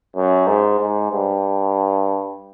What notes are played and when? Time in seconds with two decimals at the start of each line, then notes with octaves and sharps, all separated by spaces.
0.16 F#2
0.47 G#2
0.80 G#2
1.11 G2